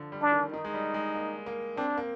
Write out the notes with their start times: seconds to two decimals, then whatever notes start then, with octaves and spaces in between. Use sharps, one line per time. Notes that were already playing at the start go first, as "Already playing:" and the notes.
Already playing: D3 F3
0.12 G3
0.22 D4
0.32 D#3
0.53 D#3 D#4
0.64 G#3
0.74 G3
0.94 G#3
1.15 A#3
1.46 A#3
1.77 C4 D4
1.97 A#3